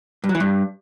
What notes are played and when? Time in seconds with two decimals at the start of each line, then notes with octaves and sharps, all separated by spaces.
0.24 G2
0.29 F#3
0.35 E3
0.40 G2